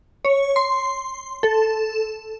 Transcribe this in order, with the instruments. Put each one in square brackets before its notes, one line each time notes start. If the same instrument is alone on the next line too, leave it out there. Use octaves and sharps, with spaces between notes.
[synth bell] C#5
C6
A4